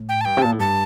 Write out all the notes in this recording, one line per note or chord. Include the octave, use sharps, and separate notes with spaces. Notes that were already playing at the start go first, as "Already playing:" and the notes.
Already playing: A2
G5
A5
G2 G5
C3
A#2 A5
A2
G2 A5